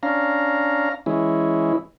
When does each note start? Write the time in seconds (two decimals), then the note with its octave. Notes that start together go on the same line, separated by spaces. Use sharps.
0.03 C#4 D4 F5 A#5
1.06 E3 G#3 C#4 E4